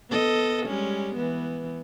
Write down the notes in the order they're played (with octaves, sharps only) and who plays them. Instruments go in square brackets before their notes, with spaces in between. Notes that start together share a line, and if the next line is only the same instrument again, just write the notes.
[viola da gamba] B3 A4 D#5
G3 G#3 C#4
E3 B3